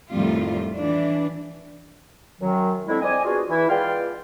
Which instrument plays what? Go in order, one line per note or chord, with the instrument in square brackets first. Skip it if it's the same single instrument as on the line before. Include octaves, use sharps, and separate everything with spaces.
[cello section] F2 A2 D#3 G3 F4
E3 D4
[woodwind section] F#2 D#3 F#3
F2 D3 G#3 C4 E4
C4 D5 D#5 G#5
B3 D4 F4 F#4 G#4
E3 E4
G#3 B3 F4 D5 F5 G5